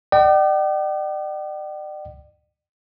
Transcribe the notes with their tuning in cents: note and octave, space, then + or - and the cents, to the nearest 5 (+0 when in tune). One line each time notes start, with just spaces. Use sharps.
D5 +40 G5 -40